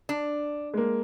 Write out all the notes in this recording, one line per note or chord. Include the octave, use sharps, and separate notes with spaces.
D4
G#3 A#3